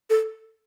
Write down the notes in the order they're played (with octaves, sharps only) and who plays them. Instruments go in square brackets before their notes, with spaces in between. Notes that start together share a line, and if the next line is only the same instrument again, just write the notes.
[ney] A4